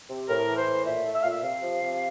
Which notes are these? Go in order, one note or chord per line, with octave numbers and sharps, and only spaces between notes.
C3
A2 A#4
E3
C5
A2
A#2 E5
A3
E5
A#2 F5
E5
C3 F5
F3
C3